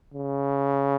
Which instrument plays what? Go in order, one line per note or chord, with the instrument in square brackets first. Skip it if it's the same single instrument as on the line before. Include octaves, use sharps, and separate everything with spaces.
[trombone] C#3